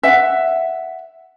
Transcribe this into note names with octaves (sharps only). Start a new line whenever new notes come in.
E5 F#5